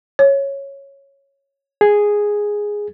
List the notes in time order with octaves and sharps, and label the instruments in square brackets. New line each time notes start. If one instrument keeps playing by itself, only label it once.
[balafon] C#5
[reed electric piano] G#4